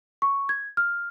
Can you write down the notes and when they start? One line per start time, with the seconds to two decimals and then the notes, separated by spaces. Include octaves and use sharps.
0.22 C#6
0.49 G#6
0.77 F6